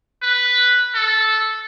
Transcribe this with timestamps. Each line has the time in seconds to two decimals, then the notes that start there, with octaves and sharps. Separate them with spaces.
0.22 B4
0.94 A4